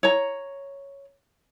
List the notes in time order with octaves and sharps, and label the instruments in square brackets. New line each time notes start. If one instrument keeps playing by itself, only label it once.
[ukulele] C#5 A#5